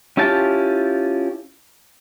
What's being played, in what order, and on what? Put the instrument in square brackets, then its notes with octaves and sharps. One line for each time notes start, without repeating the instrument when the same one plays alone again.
[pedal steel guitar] C#4 E4 F4 G4 A5